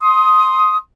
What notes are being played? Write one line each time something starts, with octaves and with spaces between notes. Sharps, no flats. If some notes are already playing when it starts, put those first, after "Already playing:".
C6 D#6